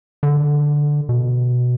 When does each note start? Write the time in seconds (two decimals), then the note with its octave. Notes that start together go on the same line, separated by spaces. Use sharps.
0.23 D3
1.09 B2